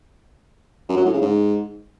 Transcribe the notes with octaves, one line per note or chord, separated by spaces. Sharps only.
F#2
F#3
A2
C#3
G#2